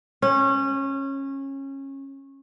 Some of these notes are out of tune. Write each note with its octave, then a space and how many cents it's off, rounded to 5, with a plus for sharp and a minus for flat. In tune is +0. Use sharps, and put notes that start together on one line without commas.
C#4 -20